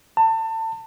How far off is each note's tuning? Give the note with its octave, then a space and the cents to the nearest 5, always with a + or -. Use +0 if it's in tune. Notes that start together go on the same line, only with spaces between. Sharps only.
A5 +30